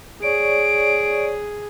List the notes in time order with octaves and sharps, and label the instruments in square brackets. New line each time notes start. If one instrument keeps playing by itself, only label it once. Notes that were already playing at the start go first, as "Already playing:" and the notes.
[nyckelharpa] G#4 [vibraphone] C#5 D5 C#6 [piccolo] D7